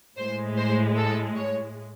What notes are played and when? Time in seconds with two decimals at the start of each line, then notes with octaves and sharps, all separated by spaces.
0.17 A2 G#3 C5
0.57 C5
0.96 A4
1.36 C#5